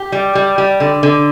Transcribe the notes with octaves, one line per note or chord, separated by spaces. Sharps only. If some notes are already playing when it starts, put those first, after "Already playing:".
Already playing: G4
G3
G3
G3
D3
D3